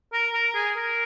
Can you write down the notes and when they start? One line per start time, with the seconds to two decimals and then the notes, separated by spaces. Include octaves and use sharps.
0.13 A#4
0.34 A#4
0.55 G#4
0.76 A#4